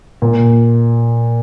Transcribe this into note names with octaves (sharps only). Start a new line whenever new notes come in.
A#2